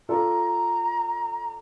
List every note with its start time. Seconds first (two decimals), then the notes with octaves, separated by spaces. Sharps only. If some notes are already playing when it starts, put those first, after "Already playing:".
0.09 F4 A4 D5 A#5